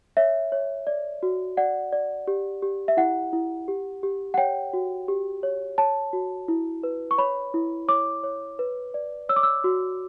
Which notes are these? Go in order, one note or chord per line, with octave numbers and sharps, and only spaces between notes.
C#5 E5
C#5
D5
F#4
D5 F#5
D5
G4
G4
E5
E4 F#5
E4
G4
G4
F#5
C#5 G5
F#4
G4
C#5
C#5 A5
F#4
E4
B4
C#6
C#5 B5
E4
C#5 D6
C#5
B4
D5
C#5 E6
D6
E6
F#4